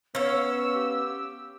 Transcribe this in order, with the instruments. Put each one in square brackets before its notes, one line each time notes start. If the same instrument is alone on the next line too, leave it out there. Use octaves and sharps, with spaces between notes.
[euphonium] B3 [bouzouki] C#4 F5 [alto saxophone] C#5 [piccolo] E6
[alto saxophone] G4